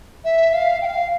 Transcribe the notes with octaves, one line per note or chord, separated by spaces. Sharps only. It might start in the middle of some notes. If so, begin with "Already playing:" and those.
E5
F5
G5
F5